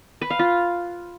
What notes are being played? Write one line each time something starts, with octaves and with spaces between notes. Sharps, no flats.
B4
F5
F4